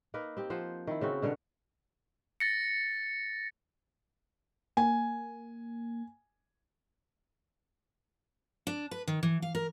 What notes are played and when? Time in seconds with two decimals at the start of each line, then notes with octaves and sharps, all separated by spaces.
0.14 A#3 D#4 A#4 B4
0.37 C4 G4
0.50 F3 C5 F#5
0.87 D#3 E4
1.01 C#3 C4 F#4
1.22 B2 D3 A#4 C#5
2.40 A6 A#6 C#7
4.77 A#3 G#5
8.67 D4
8.91 B4
9.08 D#3
9.23 E3
9.42 F5
9.55 A#4